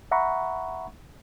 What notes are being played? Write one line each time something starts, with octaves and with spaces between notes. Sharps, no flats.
E5 F#5 A#5 B5 C#6